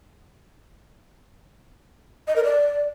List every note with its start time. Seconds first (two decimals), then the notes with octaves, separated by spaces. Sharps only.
2.28 D#5
2.36 A#4
2.44 D5